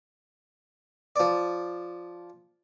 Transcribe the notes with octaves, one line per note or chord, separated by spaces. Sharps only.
F3 D5